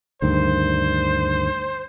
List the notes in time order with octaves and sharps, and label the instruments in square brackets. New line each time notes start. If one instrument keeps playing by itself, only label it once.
[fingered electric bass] D2 G2 D#3 [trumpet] C5